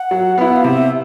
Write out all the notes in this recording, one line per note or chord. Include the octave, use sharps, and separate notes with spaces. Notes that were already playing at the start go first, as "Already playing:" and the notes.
Already playing: F#5
F#3
B3 E4
F5
C3 E5